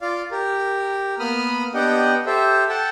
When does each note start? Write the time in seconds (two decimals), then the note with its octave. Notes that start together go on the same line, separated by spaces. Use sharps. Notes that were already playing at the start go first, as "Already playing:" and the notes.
0.01 F4 D5 F5
0.31 G4 A#4
1.20 A#3 B3 B5 D#6 F6
1.74 B3 D4 G4 D#5 F#5 G5
2.26 G4 A4 C5 E5
2.69 A4 F#5 G5 A5